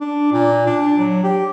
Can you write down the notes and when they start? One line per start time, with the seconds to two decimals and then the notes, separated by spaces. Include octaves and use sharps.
0.01 D4
0.32 A#2
0.66 D4
0.97 F#3
1.24 G4